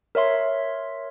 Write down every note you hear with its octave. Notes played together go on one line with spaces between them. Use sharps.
A#4 C#5 E5 C6